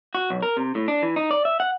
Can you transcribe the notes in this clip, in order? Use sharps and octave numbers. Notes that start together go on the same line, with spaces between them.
F#4
B1
A#4
C3
A2
D4
E3
D#4
D5
E5
F#5